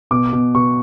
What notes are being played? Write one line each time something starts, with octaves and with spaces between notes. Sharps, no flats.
B2 D6
B2
B2 C#6